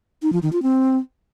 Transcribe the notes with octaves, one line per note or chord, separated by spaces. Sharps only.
D#4
F3
D#3
F4
C4